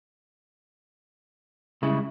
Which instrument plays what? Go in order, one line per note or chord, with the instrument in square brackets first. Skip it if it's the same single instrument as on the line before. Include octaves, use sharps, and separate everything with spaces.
[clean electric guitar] C#3 [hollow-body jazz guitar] G3 G#3 E4